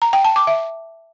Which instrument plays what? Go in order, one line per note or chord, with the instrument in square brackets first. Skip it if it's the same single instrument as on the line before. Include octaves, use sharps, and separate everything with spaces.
[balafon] A#5
G5
A5
D6
E5